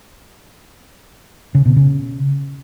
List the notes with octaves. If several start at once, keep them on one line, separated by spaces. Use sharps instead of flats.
C#3
B2
C#3